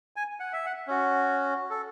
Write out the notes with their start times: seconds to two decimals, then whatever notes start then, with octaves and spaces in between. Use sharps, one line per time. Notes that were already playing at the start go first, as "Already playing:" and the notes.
0.16 G#5
0.40 F#5
0.53 E5
0.66 F#5
0.88 C#4 F#4
1.70 A4